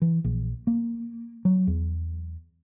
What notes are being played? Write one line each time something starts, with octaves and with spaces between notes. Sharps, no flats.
E3
A#1
A#3
F#3
E2